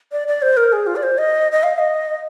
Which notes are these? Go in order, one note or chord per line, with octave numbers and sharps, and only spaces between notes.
D5
D5
C5
A#4
G#4
F4
D5
C5
D#5
D#5
F5
D#5